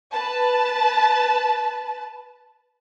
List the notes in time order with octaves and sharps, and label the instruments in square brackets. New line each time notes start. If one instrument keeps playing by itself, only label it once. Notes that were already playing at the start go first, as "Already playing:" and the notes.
[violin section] B4 A5